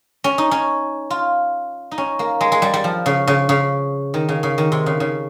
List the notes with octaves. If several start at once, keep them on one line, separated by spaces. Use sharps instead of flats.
C#4
D#4
C#4
F4
D#4
C#4
A#3
G#3
G#3
G3
G3
F3
C#3
C#3
C#3
D#3
C#3
C#3
D#3
C3
C#3
C#3